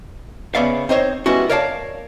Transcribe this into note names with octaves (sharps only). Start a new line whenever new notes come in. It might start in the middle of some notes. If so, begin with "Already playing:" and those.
C#3 B3 C#4 D5 E5 F5
C4 D#4 C5 C#5
G3 G#3 B3 C#4 E4 F#4
A#4 C#5 D5 F5 G#5 A5